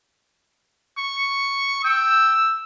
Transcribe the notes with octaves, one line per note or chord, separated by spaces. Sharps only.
C#6
G5 E6